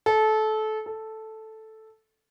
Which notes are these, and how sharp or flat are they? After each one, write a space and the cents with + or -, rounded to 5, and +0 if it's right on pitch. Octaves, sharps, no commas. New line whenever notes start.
A4 -25
A4 -5